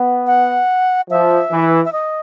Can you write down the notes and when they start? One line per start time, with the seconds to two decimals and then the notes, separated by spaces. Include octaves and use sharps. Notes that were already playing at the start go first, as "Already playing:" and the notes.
Already playing: B3
0.27 F#5
1.10 F3 E5
1.51 E3
1.85 E5
1.93 D#5